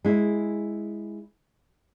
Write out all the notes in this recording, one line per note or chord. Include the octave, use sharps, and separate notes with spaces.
G#3 E4